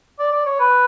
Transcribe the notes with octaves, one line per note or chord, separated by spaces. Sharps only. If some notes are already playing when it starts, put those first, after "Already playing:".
D5
D5
C#5
B4